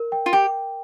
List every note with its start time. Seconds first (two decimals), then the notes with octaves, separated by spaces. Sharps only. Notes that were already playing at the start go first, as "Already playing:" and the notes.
Already playing: A#4
0.12 G5
0.26 F4
0.33 G4 G5